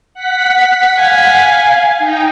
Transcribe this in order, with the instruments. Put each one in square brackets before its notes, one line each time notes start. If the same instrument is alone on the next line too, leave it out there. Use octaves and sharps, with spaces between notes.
[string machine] F#5 B6
[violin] F5 G#5
[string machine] D#4 G5